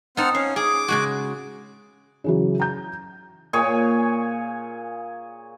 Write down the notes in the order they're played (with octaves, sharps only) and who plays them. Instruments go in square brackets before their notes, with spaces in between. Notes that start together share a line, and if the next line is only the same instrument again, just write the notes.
[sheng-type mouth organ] C4 F#5 F6 [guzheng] D#4 A5
[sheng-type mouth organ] C#4 [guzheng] F5
[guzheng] G#4 [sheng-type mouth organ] D6
[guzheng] C#3 G#3 F#4
[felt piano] C#3 E3 F#3
A#5 G6
[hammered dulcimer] A#2 G#4 C#5 G#5